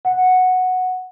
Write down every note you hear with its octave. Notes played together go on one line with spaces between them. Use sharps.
F#5